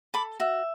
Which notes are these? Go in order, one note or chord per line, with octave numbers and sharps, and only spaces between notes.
A4 B5 D6
F#4 E5